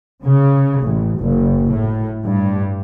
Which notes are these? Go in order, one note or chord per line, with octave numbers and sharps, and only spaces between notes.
C#3
A1
F#1
A2
G2